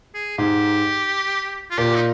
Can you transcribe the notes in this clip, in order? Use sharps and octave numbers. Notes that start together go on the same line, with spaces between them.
G#4
G#2 G4
F4
A#2 G4
D#4